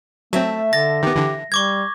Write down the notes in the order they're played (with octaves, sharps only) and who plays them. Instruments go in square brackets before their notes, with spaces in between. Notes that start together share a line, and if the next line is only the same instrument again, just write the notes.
[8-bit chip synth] F#3 C4 [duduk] A3 [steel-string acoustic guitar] E5 A5
[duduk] D3 [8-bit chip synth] A6 [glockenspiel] A#6
[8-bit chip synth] D#3 B3 [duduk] G4
[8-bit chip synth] D3 E3
[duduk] G3 [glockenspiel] C#6 D6 G#6